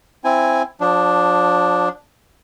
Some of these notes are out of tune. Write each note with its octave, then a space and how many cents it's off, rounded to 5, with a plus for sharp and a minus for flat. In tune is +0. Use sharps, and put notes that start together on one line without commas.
C4 +0 E4 +10 G#5 -5
F3 +35 D4 +0